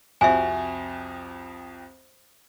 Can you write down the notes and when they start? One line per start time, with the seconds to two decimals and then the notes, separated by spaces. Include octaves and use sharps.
0.21 C2 F2 F#4 E5 G#5